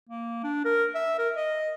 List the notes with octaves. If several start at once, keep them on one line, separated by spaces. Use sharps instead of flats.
A#3
D4
A#4
E5
A#4
D#5